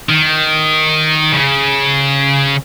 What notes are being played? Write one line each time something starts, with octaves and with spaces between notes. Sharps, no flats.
D#3
C#3